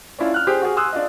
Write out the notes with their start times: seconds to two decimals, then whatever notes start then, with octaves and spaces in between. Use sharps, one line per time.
0.19 C#4 D4 E4 F4
0.34 F6 F#6
0.47 G4 G#4 C5
0.62 F#4 G#4
0.76 G#5 C6 D#6 E6 F#6
0.93 D4 F4 D#5